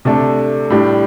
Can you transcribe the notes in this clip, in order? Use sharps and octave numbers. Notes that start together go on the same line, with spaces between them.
C3 A3 D4 A4
A2 G3 D4 G4